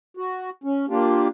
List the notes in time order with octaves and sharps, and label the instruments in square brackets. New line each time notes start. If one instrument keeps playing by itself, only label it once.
[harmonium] F#4
C#4
A#3 D4 F4 G4